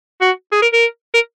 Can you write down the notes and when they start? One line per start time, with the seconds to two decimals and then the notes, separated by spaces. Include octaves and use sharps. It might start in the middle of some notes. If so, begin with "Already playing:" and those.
0.21 F#4
0.52 G#4
0.62 A#4
0.73 A#4
1.14 A#4